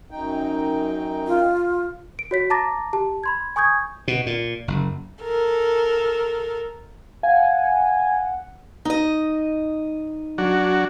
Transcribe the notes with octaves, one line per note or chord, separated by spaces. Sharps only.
F#2 D#4 G5
F4
D7
F#4 C#5 B6
A5 A#5 D6 A6 A#6
G4 A5
B5 C6 G#6
G#5 C#6 D#6 G6 G#6
B2
A#2
F#1
A4 A#4
F5 F#5 G#5
D#4 D#5
F#3 D4 F#4